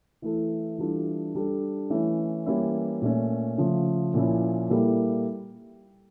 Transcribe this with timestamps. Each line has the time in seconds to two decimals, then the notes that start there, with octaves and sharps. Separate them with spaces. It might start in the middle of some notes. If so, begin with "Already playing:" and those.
0.22 E3 A3 E4 A4
0.78 E3 G3 D4 F4 A4
1.35 G3 D4 A4
1.90 E3 A3 C#4
2.46 E3 G3 A#3 C#4 E4
3.02 A#2 A3 C#4
3.58 C#3 F3 A3
4.14 A#2 F3 A#3 C#4 E4
4.70 A#2 G3 A#3 E4 A4